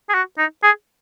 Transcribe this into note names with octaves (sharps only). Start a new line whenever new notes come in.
G#4
F#4
D#4
G#4